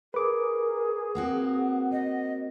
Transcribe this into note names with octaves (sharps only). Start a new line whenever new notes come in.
G#4 A#4 B4 D6
A#3 C4 F#4 F#5
D#5